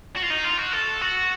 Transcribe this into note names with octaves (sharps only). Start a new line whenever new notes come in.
F#4
F4
D#4
F4
F#4
A4
F#4